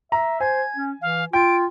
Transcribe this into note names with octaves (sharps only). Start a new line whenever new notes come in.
E5 A#5
C5 G#5 G#6
C#4
E3 F5
F4 G5 D7